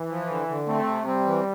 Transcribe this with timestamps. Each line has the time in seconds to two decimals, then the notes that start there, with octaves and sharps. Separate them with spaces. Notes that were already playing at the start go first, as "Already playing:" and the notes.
Already playing: E3
0.10 F3
0.28 D3
0.48 D3
0.67 A3 C4
0.87 C3
1.06 G3 C4
1.26 E3